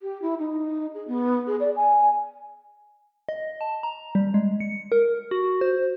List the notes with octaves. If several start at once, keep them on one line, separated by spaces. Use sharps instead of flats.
G4
E4
D#4
G#4
B3
G#4
D5
G#5
D#5
A5
A#5
G3
G#3
C#7
A#4
F#4
C5